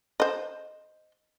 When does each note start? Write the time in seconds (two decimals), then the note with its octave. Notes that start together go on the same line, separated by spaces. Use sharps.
0.20 C5 D#5